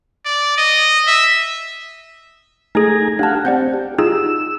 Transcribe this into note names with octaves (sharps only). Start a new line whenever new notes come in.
D5
D#5
E5
A3 D#4 G#4 G#5 A#5
D4 G4 F5 F#5 A5
C4 D5 F#5 G6
G4
D#4 F4 G#4 E6